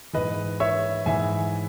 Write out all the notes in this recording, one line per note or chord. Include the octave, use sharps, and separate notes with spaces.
G#2 E3 B4 D#5
C#5 E5
G#2 E3 E5 G#5